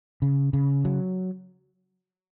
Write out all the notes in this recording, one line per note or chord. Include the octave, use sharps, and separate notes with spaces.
C#3
C#3
F#3